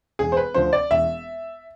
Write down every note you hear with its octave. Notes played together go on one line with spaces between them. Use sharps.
E1 G#4
C5
B4
D2 D3 F3 C5
D5
E1 E5